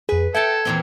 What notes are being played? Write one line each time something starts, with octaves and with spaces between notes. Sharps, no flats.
F2 G#4 B4
A4 E5 F#5 G5 A5 G#6
E2 A#2 C4